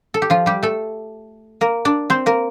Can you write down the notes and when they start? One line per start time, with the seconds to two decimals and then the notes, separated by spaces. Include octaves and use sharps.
0.14 A4
0.22 G4
0.30 F3 F4
0.46 G3 G4
0.63 A3 A4
1.61 A#3 A#4
1.85 D4 D5
2.10 C4 C5
2.26 A#3 A#4